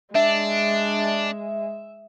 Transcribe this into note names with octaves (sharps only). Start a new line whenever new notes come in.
G#3 D4 E5